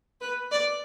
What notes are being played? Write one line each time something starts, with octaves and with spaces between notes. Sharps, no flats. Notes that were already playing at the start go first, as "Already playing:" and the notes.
B4
D5